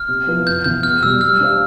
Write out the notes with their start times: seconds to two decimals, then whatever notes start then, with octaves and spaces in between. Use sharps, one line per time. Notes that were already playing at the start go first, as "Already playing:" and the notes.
Already playing: F6
0.08 C3
0.27 F3 B3 E4 B4
0.47 F2 G6
0.64 E3 B3 F4 G6
0.83 E2 F6
1.02 B2 G3 E6
1.21 G3 F6
1.40 D4 G4 C5 F5